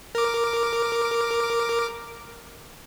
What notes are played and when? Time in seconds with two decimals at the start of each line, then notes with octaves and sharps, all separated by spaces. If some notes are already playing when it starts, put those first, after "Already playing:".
0.15 A#4 D6